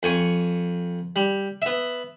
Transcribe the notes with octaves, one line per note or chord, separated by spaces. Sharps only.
F2 G#5 C#6
G3
B3 E5